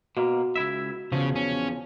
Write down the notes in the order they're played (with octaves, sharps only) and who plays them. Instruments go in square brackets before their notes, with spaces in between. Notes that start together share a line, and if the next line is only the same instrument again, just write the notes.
[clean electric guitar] B2 A#3 [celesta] F#4
[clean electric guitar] C#2 E4 E5
[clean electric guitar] E2 F3 [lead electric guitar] C#3
[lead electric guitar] C#4